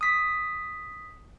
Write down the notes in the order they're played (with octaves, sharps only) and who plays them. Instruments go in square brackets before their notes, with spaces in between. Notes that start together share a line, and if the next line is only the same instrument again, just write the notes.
[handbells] D#6 B6